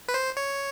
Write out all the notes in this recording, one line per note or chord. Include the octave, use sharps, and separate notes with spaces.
B4
C5
C#5